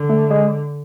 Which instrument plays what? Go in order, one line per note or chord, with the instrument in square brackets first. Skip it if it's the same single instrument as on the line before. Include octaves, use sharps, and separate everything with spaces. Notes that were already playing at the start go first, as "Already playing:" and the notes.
Already playing: [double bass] D3
[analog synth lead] A3
G#3